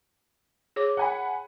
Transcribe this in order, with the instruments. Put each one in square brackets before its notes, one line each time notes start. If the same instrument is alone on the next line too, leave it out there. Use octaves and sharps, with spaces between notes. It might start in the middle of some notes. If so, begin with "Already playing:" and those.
[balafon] G#4 C#5 D6
[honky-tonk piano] F#5 G#5 B5